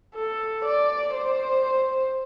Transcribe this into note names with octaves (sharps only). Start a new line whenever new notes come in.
A4
D5
C5